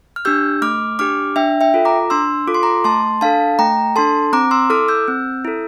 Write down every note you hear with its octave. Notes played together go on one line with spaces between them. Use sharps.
F6
D4 G4 E6 G6
A3 D6 F6
D4 G4 D6 F6
D4 E5 G5
E5 G5
F4 A4
A#5 D6
D4 C6 E6
F4 A4 D6
C6
A#5 D6
A3 A5 C6
D4 A4 F5 A5
A3 G5 A#5
D4 A4 A5 C6
C4 A#5 D6
C6 E6
E4 A4 D6 F6
E6 G6
C4
E4 A4